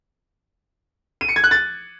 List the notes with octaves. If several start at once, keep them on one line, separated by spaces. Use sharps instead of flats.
D#7
C#7
G#6
F#6
A6